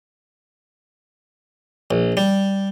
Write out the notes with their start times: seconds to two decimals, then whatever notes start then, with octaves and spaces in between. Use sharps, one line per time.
1.91 A#1
2.17 G3